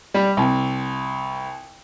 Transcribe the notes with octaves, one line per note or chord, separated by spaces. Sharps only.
G3
C2